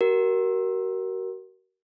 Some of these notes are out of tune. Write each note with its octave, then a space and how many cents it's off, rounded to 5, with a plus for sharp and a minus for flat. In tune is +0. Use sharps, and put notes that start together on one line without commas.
F#4 +40 A#4 +10